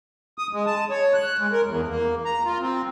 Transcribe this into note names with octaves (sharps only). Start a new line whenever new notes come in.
D#6
G#3
A5
C#5
F#6
G#3
A#4
E2
A#3
A#5
F4
C4